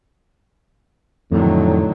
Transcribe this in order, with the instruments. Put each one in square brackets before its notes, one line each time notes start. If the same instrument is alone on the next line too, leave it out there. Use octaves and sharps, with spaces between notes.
[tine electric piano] F2 [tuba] A2 [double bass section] D3 D#3 F#3